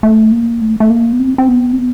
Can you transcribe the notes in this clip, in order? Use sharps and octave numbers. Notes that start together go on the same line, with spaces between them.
A3
A#3
A3
A3
A#3
B3
C4
C4
B3
C4
B3